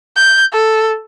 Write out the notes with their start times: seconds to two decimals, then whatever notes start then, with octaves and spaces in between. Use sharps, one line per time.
0.17 G6
0.53 A4